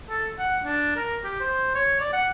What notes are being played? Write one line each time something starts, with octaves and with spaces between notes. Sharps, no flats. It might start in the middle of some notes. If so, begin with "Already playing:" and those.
A4
F#5
D4
A#4
G4
C5
C#5
D5
F#5